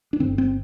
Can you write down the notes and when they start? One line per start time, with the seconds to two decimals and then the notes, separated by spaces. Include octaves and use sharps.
0.13 D4
0.20 G1 G2 D3 C4
0.38 C4